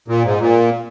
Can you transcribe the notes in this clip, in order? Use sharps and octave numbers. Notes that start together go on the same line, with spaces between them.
A#2
G#2
A#2